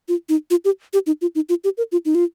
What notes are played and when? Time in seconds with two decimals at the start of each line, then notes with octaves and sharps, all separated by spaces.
0.08 F4
0.29 D#4
0.51 F4
0.65 G4
0.93 G4
1.07 D#4
1.21 F4
1.35 D#4
1.49 F4
1.64 G4
1.77 A#4
1.92 F4
2.05 D#4
2.15 F4